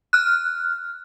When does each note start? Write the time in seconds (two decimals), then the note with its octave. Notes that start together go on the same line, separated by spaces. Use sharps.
0.13 F6 F#6